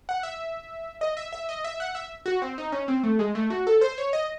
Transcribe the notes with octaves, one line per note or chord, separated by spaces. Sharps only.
F#5
E5
D#5
E5
E5
D#5
E5
F#5
E5
F#4
C4
D#4
C#4
C4
A3
G#3
A3
F#4
A4
C5
C#5
D#5